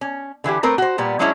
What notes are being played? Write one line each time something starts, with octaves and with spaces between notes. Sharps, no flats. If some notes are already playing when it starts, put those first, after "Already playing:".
C#4
D3 E3 E4 G4
A3 C4 A#4 B4
F#4 C5
A#2 G3 B3
F#3 G#3 C#4 D4 E4 C#5